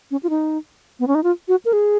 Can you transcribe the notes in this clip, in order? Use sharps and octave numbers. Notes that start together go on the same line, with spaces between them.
C#4
F4
D#4
B3
C#4
D#4
F4
F#4
A#4
G#4